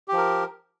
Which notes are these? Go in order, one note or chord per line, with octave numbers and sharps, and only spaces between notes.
F3 G4 A#4